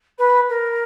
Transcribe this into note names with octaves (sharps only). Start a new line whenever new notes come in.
B4
A#4